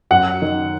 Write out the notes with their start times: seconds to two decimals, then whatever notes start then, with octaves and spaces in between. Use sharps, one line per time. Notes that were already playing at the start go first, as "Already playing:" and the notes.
0.11 F#2 F#5
0.42 D#3